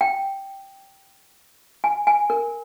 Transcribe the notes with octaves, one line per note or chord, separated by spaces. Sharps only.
G5
G#5
G#5
A#4